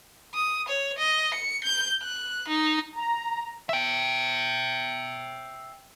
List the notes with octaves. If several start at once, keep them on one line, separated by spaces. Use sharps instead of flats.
D#6
C#5
D#5
C#7
G6
F#6
D#4
A#5
E5 G5